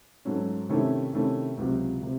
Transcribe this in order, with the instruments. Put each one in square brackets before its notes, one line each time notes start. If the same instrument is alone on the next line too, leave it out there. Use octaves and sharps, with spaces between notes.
[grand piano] G#2 F#3 A3 C#4
C3 D#3 A3 C#4 E4
C3 D#3 A3 C#4 E4
C#2 C3 F#3
C3